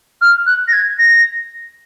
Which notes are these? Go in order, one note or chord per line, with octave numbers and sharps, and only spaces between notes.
F6
F#6
A#6
G#6
A#6